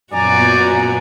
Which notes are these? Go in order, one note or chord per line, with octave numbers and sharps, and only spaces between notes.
F#2 A#2 B3 F#4 D5 G#5 A#5